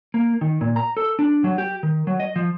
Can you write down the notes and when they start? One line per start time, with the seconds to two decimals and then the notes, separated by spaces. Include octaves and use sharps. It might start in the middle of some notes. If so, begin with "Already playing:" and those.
0.14 A#3
0.41 D#3
0.61 A#2
0.76 A#5
0.97 A4
1.19 D4
1.44 F#3
1.58 G4
1.83 D#3
2.07 F#3
2.20 D#5
2.36 F3